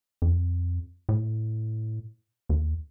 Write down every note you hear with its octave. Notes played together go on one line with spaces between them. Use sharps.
F2
A2
D#2